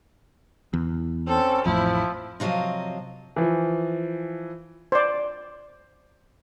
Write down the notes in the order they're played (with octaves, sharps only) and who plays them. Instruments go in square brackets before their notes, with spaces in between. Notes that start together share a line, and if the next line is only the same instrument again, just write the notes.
[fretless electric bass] E2
[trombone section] C4 C#4 [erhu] A4
[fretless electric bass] A1 F2 A2 [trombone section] F3 [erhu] E4
[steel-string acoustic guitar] C3 F3 F#3 D#5 F5
[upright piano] E3 F3
[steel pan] C5 D5